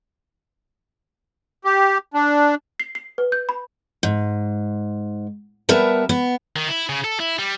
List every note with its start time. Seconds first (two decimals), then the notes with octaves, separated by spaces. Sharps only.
1.65 G4
2.14 D4
2.80 C7
2.95 C7
3.18 B4
3.32 G6
3.49 B5
4.03 G#2
5.69 G3 B3 A#4 B4 E5 A5
6.09 B3
6.56 D#3
6.68 E4
6.89 C#3
7.04 A4
7.20 E4
7.39 G3